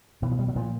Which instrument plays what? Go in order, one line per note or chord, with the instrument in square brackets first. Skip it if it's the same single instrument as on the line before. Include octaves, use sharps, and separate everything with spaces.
[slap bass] B2 E3
F3
G3
F#3
A#2 F3